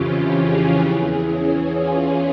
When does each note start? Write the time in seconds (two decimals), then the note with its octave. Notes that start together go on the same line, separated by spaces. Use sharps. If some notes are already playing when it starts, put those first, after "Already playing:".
Already playing: F2 C#3 E3 C#4 F4 G4
0.39 G#4
0.84 E2 E3 G#4
1.30 C#4
1.76 F4